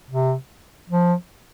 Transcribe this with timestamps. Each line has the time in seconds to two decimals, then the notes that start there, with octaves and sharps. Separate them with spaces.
0.10 C3
0.89 F3